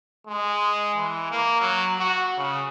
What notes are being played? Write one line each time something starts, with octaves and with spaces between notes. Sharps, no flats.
G#3
E3
A#3
F#3
F#4
C#3